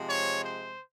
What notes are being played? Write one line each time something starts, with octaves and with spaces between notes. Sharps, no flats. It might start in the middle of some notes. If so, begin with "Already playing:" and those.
Already playing: C3 F3 G#3
C#5
C5